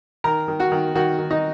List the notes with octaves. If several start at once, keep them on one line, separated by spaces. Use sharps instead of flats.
D#3 A#4 A#5
D#3
F#4 F#5
D#3
D#3 F#4 F#5
D#3
D#4 D#5